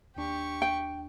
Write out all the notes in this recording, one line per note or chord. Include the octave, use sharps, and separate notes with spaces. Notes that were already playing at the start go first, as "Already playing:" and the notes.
D#2 D4 G4 C#6
G5